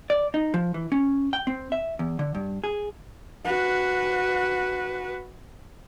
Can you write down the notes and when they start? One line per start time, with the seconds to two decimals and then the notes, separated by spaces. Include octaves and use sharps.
0.10 D5
0.34 D#4
0.54 F3
0.74 E3
0.92 C#4
1.33 G5
1.47 C4
1.72 E5
1.99 E2
2.19 D3
2.35 G2
2.64 G#4
3.45 F#4 B4